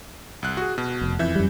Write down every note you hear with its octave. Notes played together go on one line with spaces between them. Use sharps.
C2 F#6
F#4 G#4
B2
F1
F2 E3 E5 G6
F#2 G3